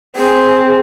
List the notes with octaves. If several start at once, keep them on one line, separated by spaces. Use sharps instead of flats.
C4 G#4